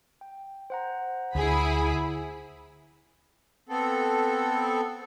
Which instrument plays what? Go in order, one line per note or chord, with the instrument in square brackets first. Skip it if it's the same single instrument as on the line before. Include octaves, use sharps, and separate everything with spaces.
[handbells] G5
C5 F#5 A#5
[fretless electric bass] D2 [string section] E4 G#4 B5
[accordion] B3 C4 A4